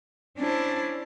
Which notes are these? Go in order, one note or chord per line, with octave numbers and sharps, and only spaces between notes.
C#4 D4 E4 C5 A5